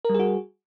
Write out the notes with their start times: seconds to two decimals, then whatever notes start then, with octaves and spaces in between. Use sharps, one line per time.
0.05 A#4
0.10 G3
0.14 G#4
0.19 F#4